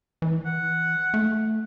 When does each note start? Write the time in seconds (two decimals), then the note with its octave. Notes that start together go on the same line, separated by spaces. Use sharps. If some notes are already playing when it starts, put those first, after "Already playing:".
0.22 E3
0.46 F#5
1.14 A3